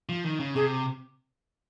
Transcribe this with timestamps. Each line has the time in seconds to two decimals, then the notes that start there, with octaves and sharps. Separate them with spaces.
0.09 F3
0.25 D#3
0.40 C#3
0.56 C3 G#4